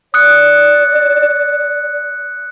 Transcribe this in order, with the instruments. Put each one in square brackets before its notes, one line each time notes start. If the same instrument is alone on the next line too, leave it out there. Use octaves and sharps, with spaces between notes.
[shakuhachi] D5 [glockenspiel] D#6 F#6 C#7